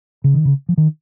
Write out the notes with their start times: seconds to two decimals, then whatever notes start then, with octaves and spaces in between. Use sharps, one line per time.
0.24 C#3
0.34 D#3
0.45 C#3
0.69 F3
0.78 D#3